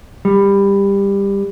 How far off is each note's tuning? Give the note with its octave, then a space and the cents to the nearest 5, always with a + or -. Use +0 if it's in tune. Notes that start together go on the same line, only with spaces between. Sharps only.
G3 +20